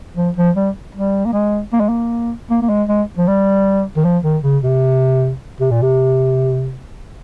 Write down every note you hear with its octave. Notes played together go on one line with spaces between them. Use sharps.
F3
F3
G3
G3
A#3
G#3
A#3
G#3
A#3
A#3
A#3
G#3
G#3
F3
G3
D#3
F3
D#3
C#3
C3
C3
A#2
C3